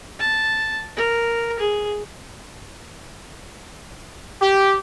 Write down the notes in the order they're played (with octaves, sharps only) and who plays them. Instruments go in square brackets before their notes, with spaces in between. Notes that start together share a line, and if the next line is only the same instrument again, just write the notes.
[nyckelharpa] A5
A#4
G#4
[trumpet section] G4